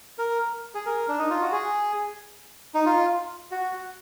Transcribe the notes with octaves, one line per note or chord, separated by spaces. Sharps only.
A#4
G#4
A#4
D4
D#4
F4
F#4
G#4
D#4
F4
F#4